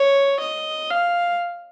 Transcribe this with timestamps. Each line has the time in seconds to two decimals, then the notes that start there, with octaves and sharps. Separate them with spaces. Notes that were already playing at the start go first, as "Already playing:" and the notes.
Already playing: C#5
0.40 D#5
0.90 F5